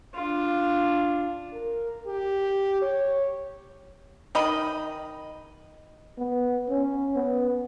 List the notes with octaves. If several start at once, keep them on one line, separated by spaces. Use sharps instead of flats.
D4 F4
A#4
G4
C#5
D#3 D#5 B5
B3
C#4
B3